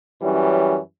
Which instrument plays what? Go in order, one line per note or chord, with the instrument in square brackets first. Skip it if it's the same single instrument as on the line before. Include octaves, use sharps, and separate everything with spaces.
[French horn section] F#2 E3 G3 C#4